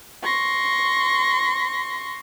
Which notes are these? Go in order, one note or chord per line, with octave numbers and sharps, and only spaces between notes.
C6 C#6 A#6